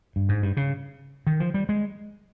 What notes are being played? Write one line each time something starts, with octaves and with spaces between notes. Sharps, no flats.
G2
G#2
G2
C#3
D#3
F3
G3
G#3